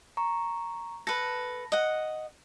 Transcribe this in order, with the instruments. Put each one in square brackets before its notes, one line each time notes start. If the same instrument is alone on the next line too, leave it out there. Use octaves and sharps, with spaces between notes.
[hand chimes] A#5 C#6
[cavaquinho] A4 B4 [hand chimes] A#6
[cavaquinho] D#5 F#5